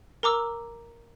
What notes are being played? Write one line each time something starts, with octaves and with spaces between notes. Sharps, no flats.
A#4 A#5 D6 E6